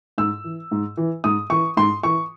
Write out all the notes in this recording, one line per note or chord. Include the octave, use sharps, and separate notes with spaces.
G#2 E6
E3
G#2
E3
G#2 D#6
E3 C#6
G#2 C6
E3 C#6